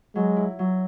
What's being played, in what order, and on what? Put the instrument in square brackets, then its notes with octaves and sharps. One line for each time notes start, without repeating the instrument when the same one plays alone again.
[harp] F#3 [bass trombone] G#3
[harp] E4
F#3